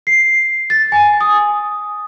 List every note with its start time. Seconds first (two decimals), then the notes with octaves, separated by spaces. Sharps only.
0.07 C7
0.70 A6
0.92 G#5
1.21 D#6